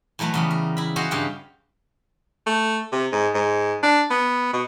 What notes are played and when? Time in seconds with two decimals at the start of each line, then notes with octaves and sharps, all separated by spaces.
0.19 E2 F#3 A3 B4 A#5
0.34 E2 C#3 G3
0.51 A#4
0.77 E4 B5
0.96 F#4 G#4 C5 D#5 F5 F#5
1.11 G2 C#3 G4 F5 G5
2.47 A3
2.92 C3
3.12 G#2
3.34 G#2
3.83 D4
4.10 B3
4.53 B2